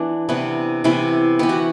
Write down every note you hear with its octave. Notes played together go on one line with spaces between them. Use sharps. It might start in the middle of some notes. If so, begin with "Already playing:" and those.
Already playing: E3 B3 D4
C3 E3 B3
C3 E3 B3 E4
E3 B3 G4
F#4